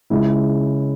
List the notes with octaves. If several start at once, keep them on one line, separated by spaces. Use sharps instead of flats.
C#2 C#3 G#3 C#4 E4